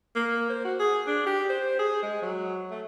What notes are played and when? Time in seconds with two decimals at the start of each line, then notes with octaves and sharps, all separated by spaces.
0.16 A#3
0.50 C5
0.65 F#4
0.80 G#4
1.07 D4
1.27 G4
1.50 C5
1.79 G#4
2.03 G#3
2.22 F#3
2.71 A3